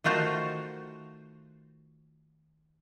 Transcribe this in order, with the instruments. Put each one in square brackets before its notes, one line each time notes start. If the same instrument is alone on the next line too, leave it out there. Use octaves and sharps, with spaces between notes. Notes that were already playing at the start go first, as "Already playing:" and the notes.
[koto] D#3 A3 F4 F#4 C5